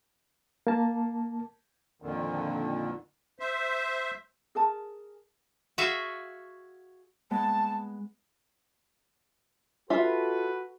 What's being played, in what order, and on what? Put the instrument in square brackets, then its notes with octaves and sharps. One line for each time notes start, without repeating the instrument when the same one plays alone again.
[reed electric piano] A#3 A5
[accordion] F2 A#2 D3 D#3
C5 E5
[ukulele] G#4 A#4 A5
[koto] F#4 G#4 C#5 E5 F5
[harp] G#3 B3 [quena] A5
[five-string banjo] F4 E5 [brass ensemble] F#4 A4 B4